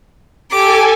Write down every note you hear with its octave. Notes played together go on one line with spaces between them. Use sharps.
G4 A4 G#5 D6